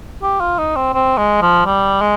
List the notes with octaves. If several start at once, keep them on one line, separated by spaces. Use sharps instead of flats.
G4
F4
D#4
C4
C4
G#3
F3
G3
G#3